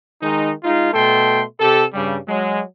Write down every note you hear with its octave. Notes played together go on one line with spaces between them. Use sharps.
D#3 G#3 D#4
G#3 D#4 F4
B2 A3 A4 G5 C6
C3 G4 A4
G2 C#3 G3
F#3 G#3